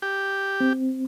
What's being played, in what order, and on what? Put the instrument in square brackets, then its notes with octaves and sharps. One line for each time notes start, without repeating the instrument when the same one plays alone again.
[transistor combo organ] G4
[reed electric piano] C4